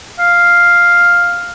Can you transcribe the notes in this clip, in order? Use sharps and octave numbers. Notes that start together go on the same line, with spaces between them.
F5